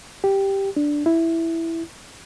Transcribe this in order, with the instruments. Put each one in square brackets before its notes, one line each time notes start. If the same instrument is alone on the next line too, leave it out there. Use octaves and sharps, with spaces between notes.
[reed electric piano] G4
D4
E4